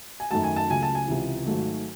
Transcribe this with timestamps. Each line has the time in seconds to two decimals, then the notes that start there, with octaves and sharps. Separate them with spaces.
0.20 G#5
0.31 F#2 D#3 A3 A5
0.43 G#5
0.56 A5
0.69 C#2 C#3 F#3 A3 G#5
0.82 A5
0.95 G#5
1.08 C#2 C3 E3
1.46 G#1 G#2 F#3 A3